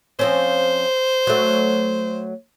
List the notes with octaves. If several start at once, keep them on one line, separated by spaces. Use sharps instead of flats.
F3 C4 C#4 C5
F#3 A3